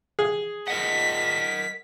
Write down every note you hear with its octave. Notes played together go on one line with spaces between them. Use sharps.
G#4
A#4 D#5 F#5 B6